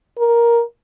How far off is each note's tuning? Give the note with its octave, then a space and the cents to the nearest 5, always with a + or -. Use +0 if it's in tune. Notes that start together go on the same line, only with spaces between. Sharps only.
A#4 +10